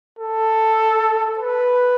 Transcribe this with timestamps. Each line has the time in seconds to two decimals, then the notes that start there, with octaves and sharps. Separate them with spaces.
0.19 A4
1.39 B4